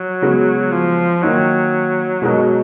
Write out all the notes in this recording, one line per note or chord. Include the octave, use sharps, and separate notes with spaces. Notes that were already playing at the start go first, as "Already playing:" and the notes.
Already playing: F#3
C#3 G#3 B3 F#4
F3
D#3 F#3 A#3 D#4
B2 G#3 D#4 F#4 A#4